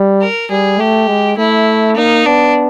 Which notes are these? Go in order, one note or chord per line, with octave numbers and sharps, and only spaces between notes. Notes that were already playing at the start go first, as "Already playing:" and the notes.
Already playing: G3
A#4
G3 G#4
A3 G4
G#3
A3 E4
A#3 D#4
B3 D4